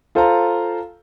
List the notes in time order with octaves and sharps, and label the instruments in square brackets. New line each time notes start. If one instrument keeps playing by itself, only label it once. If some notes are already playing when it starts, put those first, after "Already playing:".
[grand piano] F4 A4 C5 F5 A5 A#5